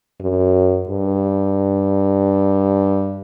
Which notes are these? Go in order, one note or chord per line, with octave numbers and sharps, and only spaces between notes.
F#2
G2